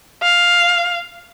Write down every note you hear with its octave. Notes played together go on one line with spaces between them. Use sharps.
F5